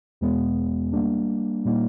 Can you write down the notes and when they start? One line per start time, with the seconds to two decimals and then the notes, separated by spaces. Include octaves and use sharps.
0.21 E2 B2 G#3 B3
0.93 G3 A#3 D4
1.65 A#2 G3 A#3 D#4